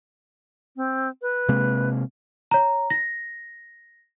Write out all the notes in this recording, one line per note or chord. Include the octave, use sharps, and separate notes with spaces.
C4
B4
C3 G#3 A#3
C#5 A#5
A#6